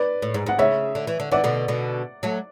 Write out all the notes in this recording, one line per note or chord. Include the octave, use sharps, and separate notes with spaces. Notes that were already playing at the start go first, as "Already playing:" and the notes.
Already playing: B4 D5
A2
G#2
G#2 F#5
C#3 C#5 E5
D3
E3
D3
E3 D5 F#5
B2 D3
B2 D3
F#3 A3